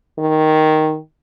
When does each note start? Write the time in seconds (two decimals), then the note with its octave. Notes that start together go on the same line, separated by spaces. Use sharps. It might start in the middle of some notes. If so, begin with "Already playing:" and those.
0.18 D#3